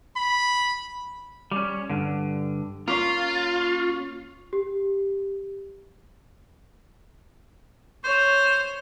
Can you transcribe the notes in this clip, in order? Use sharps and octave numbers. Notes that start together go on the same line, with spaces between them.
B5
G3 C#4
G2 D3
A#3 C#4 F4 F5
G4
C5 C#5